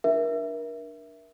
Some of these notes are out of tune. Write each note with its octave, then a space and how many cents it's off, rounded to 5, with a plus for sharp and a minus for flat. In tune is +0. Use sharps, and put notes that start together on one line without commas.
D4 +10 A#4 +30 E5 +0